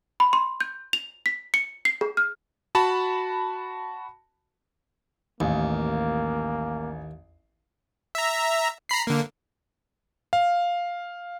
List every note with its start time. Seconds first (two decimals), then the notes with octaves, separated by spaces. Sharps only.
0.20 B5
0.33 C6
0.60 G6
0.93 F7
1.26 B6
1.54 C#7
1.85 C7
2.01 G#4
2.17 F6
2.75 F#4 A5 B5
5.40 A1 D#2 A#3
8.15 E5 A#5
8.89 A#5 B5 C7
9.07 D3 A#3
10.33 F5